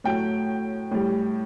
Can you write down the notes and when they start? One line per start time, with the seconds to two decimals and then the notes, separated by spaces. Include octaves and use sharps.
0.04 A2 F#3 A3 G5
0.91 A2 G3